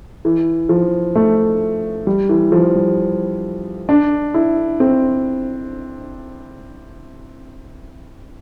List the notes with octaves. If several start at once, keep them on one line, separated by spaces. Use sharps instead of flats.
E3
F3
A3
G3
E3
F3
G3
D4
E4
C4